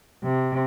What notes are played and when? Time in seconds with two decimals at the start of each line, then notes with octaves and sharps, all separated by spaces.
0.23 C3